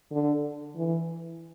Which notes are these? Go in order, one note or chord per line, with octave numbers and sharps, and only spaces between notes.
D3
E3